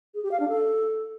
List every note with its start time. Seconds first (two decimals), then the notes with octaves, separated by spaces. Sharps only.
0.14 G#4
0.23 G4
0.31 F5
0.40 D4
0.48 A4